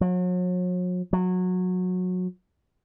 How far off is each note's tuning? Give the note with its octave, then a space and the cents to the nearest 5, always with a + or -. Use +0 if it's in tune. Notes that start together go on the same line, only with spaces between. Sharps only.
F#3 -40
F#3 -20